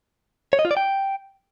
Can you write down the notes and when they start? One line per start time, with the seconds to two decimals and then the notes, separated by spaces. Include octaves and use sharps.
0.53 C#5
0.59 D#5
0.65 F4
0.71 D5
0.77 G5